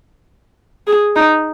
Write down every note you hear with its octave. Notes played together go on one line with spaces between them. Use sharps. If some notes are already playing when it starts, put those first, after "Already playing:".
G#4
D#4